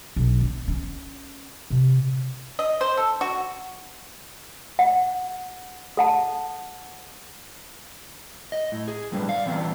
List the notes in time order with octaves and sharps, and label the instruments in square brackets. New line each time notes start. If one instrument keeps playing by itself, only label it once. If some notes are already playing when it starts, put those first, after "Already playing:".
[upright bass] B1
D4
C#4
C3
[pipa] D#5
C5
A4
F#4
[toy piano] F#5
A4 F#5 A5
[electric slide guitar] D#5
A2
G#4
F2 A2 D3 G3 B4
D5 F5
D3 E3 G3 B3 C4 D4